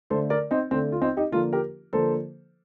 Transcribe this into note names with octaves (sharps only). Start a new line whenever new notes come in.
D3 A3 A4 C5
A#4 D5
C4 D#4
D3 A3 C4
F4
C4 D#4
D#4 G4
D3 F3 A#3 F4 A4
G4 A#4
D3 F3 A#3 A4 C5